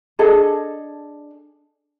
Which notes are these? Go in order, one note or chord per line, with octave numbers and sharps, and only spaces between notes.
D4 G#4 A4 D#5